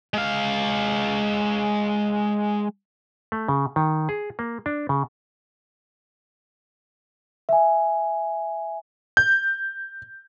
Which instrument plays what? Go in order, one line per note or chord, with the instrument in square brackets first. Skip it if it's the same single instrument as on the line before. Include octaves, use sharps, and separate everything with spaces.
[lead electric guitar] G#3 F5
[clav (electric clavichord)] A3
C#3
D#3
G#4
A#3
D4
C#3
[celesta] E5 G#5
[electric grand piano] G6